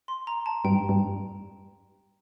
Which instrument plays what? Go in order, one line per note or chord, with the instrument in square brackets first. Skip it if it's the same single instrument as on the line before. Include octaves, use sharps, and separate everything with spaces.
[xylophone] C6
A#5
A5
[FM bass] G2 [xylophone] G5
[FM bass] G2